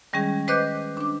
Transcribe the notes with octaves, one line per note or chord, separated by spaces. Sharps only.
D#3 G3 G#3 C#4 G#4
B4 C5 D#5 D6 F#6 G6
D4 D6